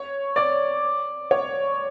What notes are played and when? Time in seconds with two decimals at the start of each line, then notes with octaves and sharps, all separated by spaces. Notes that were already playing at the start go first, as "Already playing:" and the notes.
Already playing: C#5 C#6
0.36 D5 D6
1.31 C#5 C#6